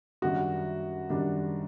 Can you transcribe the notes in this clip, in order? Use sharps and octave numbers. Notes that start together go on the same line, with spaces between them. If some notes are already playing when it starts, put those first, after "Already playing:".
F#2 D#3 G3 D4 F#4
F#2 D#3 G3 D4